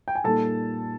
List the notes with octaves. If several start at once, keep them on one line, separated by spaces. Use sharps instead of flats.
G5
G#5
A#2 G3 A#3 D#4 A4 A5